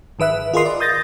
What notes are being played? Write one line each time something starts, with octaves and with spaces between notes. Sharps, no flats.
G#1 D#3 B4 E5 F#6
F4 G#4 A#4 D#5 C6 D#6
D5
D#6 G6 A6 A#6